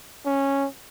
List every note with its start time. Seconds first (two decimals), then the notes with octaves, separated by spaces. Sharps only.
0.26 C#4